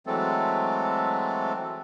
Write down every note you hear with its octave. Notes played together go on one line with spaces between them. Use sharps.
E3 F#3 G#3 A3 C4 A4